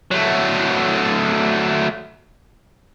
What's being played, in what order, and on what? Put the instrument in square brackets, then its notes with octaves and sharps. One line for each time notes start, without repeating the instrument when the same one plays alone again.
[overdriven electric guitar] F#3 A3